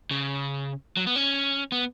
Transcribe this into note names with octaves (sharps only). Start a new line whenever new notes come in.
C#3
F#3
B3
C#4
B3